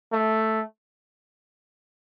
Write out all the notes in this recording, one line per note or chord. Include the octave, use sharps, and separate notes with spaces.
A3